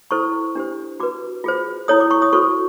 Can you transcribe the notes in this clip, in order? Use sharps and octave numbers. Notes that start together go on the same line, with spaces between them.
E4 A4 C5 C#6
D4 G4 C5
F#4 B4 D6
F4 G#4 C5
E4 A4 C#5 D#6
D6
C#6
D#6
F#4 A4 C5 C#6